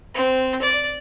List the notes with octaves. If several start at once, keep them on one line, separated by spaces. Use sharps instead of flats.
C4
D5